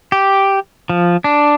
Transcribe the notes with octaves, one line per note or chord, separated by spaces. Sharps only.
G4
F3
D4